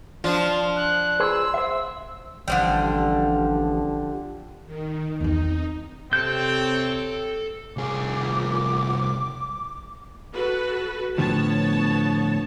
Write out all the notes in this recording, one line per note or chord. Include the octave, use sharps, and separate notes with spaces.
F3 D4 F4
F#6
G#4 B4 C5 E6
C5 E5
A1 D3 F3 G3
D#3
E2 C4 D#4
C3 C4 A4 C#5 G5 G6
C2 G#4 D6
F#4 A4 B4
A2 D3 F3 B3 C#5 A5